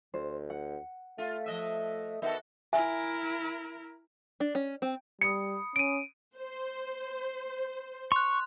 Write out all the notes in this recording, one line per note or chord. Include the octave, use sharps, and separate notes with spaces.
D2 C5
F#5
A3 F4
F3 D#5 E5
D#3 B3 F#4 A4 E5
E4 A#4 E5 G#5
D4
C#4
C4
G3 B5 D#6 C#7
C#4 D7 D#7
C5
C6 C#6 F#6